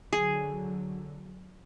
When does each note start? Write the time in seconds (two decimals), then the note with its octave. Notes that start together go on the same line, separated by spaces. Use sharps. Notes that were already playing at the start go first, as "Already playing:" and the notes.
0.13 D3 F#3 G#4